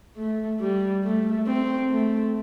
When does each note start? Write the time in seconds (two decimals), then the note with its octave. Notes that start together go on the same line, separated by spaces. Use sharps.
0.17 A3
0.60 G3
1.04 A3
1.47 C4
1.91 A3